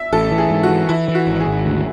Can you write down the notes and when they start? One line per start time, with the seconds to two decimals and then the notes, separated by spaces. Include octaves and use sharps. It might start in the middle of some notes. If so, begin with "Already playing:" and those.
Already playing: E5
0.13 A1 A4
0.32 E3
0.38 G#4
0.50 G#2
0.63 F#4
0.69 E3
0.89 E3 E4
1.08 E3
1.15 F#4
1.27 G#1
1.40 G#4
1.47 G#1
1.66 D2